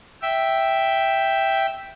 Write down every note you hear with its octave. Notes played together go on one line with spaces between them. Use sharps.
E5 G5